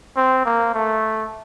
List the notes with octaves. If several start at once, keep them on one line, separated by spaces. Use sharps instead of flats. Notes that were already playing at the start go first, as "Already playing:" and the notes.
C4
A#3
A3